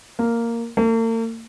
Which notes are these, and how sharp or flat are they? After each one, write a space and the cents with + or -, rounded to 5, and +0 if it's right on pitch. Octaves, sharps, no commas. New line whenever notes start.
A#3 -5
A#3 -45